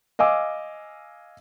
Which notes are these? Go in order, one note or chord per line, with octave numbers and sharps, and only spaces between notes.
D#5 F5 G#5 D6 E6